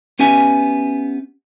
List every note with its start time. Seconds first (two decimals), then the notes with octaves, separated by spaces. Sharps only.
0.19 B3 C#4 G4 E5 G#5